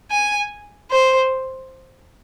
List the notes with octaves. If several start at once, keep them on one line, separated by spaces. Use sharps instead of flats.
G#5
C5